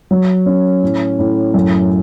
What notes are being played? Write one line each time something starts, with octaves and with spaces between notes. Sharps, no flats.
F#3
C#4
A2
A2
F#2